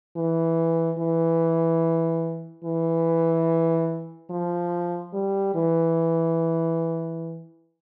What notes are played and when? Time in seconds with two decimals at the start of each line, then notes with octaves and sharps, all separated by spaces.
0.16 E3
0.99 E3
2.64 E3
4.30 F3
5.13 G3
5.55 E3